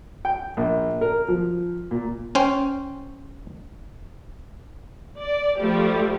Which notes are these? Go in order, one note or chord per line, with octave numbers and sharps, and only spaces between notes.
G5
A#1
A#4
F3
A#2
C#4 C5 G5
D5
F3 G3 A3 G4